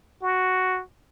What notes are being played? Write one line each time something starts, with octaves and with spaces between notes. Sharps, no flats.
F#4